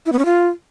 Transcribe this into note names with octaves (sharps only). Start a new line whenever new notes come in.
E4
B3
C#4
F4